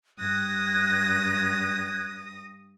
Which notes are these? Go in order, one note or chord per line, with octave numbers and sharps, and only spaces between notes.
G2 D#6 F#6 G#6 A#6